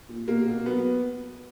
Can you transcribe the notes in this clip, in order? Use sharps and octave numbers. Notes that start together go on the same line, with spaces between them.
A#2
B2 A#3
B2
F#3 B3